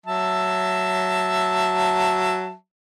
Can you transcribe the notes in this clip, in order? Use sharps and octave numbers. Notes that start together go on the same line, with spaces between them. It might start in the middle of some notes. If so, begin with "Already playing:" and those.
F#3 E5 A5